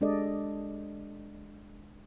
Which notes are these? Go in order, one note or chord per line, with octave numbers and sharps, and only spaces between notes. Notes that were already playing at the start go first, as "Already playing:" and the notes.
G#3 D4 G4 A4 D5 D#5